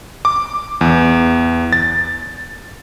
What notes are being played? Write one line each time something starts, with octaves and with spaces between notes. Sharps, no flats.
D6
E2
A6